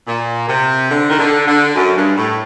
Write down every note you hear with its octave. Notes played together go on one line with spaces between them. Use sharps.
A#2
C3
D3
D#3
D3
D3
F#2
G2
A2